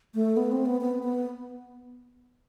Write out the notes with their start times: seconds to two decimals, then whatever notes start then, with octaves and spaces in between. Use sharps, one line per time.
0.15 A3
0.37 B3
0.52 C4
0.66 B3
0.81 B3
1.03 B3